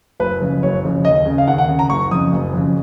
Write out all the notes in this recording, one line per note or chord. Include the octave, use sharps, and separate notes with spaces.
F#1 B4
F2 C#3
F#1 C#5
F2 C#3
D#2 D#5
C#3
F5
D#2 F#5
F#5
C#3
A#5
F#1 C#6
F2 C#3 D#6
F#1
F2 C#3